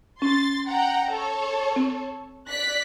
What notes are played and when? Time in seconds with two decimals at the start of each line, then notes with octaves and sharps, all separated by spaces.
0.22 C#4 C6 A6
0.68 F#5 G5 A#5
1.11 A4 C#5
1.76 C4
2.51 D5 F#6 B6